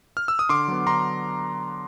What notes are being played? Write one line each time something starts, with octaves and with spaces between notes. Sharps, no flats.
F6
E6
D#6
D3 C6 D6
F#3 B3
D3 A#5 C6